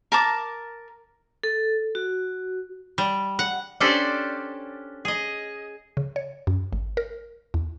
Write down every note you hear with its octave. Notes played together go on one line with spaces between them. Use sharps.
A#4 A5 D6
A4
F#4
G3
F#5
C#4 D4 G4 A4 C5 D5
G#4 D#5
C#3
C#5
F#2
G#1
A#4
E2